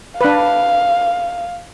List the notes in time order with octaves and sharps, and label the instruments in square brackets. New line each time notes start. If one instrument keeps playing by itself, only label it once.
[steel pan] D4 B4 [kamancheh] F5